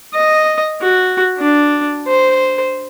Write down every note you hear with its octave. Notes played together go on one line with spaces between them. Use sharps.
D#5
F#4
D4
C5